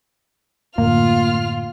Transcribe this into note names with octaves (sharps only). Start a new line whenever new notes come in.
F#2 A2 D3 A#3 F4 F6